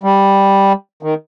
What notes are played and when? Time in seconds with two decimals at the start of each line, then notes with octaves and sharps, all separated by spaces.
0.03 G3
1.03 D#3